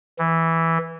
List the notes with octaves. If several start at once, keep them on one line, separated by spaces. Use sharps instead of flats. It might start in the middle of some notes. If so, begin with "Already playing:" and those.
E3